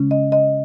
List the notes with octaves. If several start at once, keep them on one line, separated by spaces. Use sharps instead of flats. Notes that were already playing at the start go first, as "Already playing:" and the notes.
Already playing: C#3 G#3 C#4
D#5
D#5